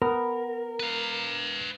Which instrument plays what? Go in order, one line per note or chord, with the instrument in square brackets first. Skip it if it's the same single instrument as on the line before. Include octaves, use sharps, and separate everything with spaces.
[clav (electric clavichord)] B3 [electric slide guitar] A#4
[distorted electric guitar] B4 F5